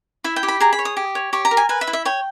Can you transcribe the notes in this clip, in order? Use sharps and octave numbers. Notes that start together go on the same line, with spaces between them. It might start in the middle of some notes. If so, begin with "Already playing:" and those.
E4 E5
G5
G4
B5
G#4 A#5
B5
C#5
D#6
G4
C#5
G4 C#6
A#5
A#4
G#5
B4 G#5
E5
E4
E5
C#5 G5